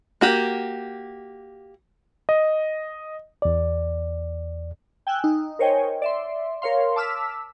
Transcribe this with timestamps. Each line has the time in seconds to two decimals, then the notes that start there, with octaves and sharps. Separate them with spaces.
0.21 A#3 F#4 G4
2.29 D#5
3.42 E2 D5
5.07 G5 G#5 E6 F#6
5.24 D#4
5.59 A#4 C5 C#5 D#5 G5 G#5
6.02 D5 E5 C6
6.62 A#4 C#5 F5 C6
6.96 A5 D6 E6 F6 B6